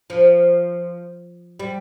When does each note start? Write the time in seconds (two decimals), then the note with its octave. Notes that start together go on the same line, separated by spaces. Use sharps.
0.10 F3
1.60 G3